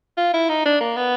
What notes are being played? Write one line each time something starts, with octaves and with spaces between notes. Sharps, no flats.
F4
E4
D#4
D4
A#3
B3